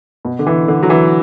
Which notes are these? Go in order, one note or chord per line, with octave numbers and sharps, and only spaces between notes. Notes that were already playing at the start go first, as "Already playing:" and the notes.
B2
D3
E3
D3
F#3
E3